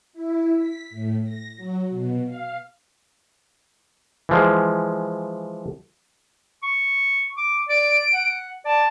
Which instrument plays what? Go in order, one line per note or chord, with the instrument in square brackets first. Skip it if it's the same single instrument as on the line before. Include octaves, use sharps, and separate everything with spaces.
[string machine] E4
B6
A2
A#6
F#3
B2
F5
[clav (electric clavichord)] E3 F3 G#3
[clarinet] C#6
D6
[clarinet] D5 [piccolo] D7
[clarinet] F#5
[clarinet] D5 [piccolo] A5